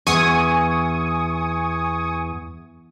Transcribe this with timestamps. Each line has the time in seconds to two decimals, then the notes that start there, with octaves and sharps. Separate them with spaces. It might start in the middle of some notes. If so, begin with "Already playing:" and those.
0.07 E2 G#5 C#6 D#6